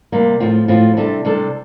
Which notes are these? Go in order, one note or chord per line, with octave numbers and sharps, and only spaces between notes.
C3 G3 A#3
A2 F3 C4 F4
A2 F3 C4 F4
C3 G3 D4 A4
C3 G3 D4 A4